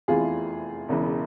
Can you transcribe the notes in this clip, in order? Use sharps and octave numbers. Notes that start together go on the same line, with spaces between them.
F1 E2 C3 E3 F4 G#4
E1 E2 C#3 E3